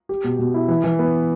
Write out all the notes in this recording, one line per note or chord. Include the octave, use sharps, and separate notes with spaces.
G4
B2
B2
E4
E3
E3
B3